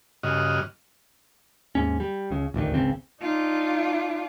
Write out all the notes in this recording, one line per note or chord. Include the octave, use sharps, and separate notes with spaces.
G2 C#3 F#4 D#5 F6
D#2 G#2 C#4
G3
C#2 C#3
D#1 A1 D2 D#3
G#1 C#2 C#3 C4
D4 D#4 F4